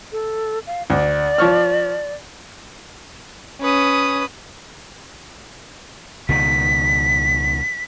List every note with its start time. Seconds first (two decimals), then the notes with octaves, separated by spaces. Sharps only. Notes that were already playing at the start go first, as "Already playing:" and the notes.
0.12 A4
0.67 F5
0.90 D2 D5
1.38 F3 C#5 F6
3.62 C#4 B4 D#6
6.29 C#2 B2 D#3 B6